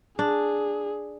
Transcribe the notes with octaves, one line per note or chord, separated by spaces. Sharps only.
D4 G#4